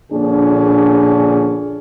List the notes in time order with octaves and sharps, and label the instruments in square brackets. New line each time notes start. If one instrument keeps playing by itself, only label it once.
[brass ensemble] A#1 A#2 D3 C#4 D4 G#4